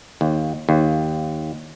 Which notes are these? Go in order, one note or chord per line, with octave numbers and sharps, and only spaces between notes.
D#2
D#2